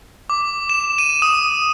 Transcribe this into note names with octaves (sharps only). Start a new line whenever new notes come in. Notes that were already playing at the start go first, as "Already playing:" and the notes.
D6
E7
D#7
D#6